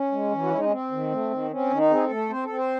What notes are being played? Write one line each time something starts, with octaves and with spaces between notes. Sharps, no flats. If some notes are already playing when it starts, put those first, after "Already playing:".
Already playing: C#4
G#3
E3
F#4
G#3 E4
D#4
C#4
C4
D#3
A3
D#3
C4 C#4
D#3
D#4
C4 G#4
A4
A3
C4 C5
A4
C4
C5